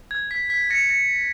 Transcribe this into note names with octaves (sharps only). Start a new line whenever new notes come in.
G#6
B6
B6
A#6 C#7
A#6 C#7